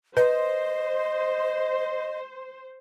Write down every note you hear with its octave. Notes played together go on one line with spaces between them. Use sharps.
B4 C5 D#5